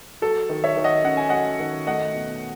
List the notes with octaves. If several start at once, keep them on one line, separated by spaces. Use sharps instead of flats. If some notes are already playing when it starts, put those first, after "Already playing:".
F#3 A4
D#3
C#5 E5
D#3
D#5 F#5
C#4 F#5
G#5
F#3 D#5 F#5
D#3
A3 D#5 F#5
B2